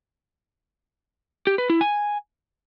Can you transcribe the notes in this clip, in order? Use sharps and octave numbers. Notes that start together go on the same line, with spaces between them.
G4
B4
E4
G#5